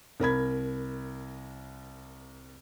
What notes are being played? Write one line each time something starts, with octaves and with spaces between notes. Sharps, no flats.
C2 A#4 B5 G#6